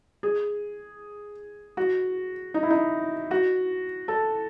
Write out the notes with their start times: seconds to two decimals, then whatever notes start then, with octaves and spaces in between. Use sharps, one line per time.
0.23 G#4
1.77 F#4
2.54 D#4
2.63 E4
2.70 D#4
3.31 F#4
4.08 A4